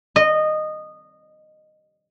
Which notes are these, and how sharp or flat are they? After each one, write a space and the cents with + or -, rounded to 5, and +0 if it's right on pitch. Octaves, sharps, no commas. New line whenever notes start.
D#5 -15